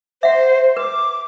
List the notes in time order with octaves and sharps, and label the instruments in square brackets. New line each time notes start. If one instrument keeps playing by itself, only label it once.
[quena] C5 [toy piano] E5 F#5
[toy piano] B4 [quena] D6